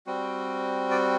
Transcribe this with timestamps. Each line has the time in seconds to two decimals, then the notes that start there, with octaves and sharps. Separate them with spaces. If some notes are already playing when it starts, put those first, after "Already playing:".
0.06 G3 C4 F#4
0.91 D5